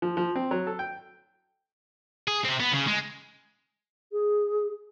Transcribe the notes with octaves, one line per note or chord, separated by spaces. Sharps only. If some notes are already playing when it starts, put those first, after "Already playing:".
F3
F3
C4
F#3
A4
G5
G#4
C3 C4
B3
C#3
G#3
G#4